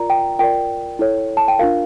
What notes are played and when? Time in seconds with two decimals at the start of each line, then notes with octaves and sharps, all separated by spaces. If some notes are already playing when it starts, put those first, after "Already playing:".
Already playing: F4 A#4 D5 A#5
0.10 G5
0.39 F4 A#4 D5 G5
0.99 E4 A4 C#5
1.37 A5
1.48 G5
1.59 D4 F4 A#4 F5